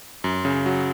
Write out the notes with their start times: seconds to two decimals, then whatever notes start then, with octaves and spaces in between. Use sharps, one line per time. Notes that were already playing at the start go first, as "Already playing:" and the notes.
0.24 F#2
0.45 C#3
0.66 F#3